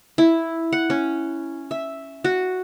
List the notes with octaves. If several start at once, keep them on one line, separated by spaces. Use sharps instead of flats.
E4
F#5
C#4
E5
F#4